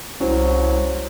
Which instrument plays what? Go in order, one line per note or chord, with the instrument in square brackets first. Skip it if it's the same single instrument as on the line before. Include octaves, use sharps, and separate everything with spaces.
[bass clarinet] C2 [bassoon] F#3 [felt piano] C#4 E4 C5